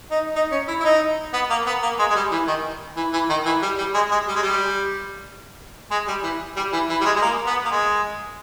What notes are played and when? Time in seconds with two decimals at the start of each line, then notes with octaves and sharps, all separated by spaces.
0.11 D#4
0.36 D#4
0.52 C#4
0.68 E4
0.80 E4
0.84 D#4
1.33 B3
1.50 A#3
1.66 B3
1.82 A#3
1.99 G#3
2.10 G#3
2.15 G3
2.32 E3
2.47 D#3
2.97 E3
3.13 E3
3.29 D#3
3.46 E3
3.62 G3
3.78 G3
3.94 G#3
4.11 G#3
4.28 G3
4.35 G#3
4.42 G3
5.91 G#3
6.08 G3
6.23 E3
6.56 G3
6.73 E3
6.90 E3
7.01 G3
7.05 G#3
7.16 G#3
7.22 A#3
7.46 B3
7.65 A#3
7.71 G#3